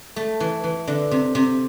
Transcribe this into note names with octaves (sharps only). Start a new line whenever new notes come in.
A3
E3
E3
D3
C3
C3